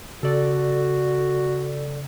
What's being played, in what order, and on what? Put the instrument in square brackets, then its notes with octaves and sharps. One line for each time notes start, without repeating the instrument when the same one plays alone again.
[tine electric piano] C#3 [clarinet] F#4 [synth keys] A4 D5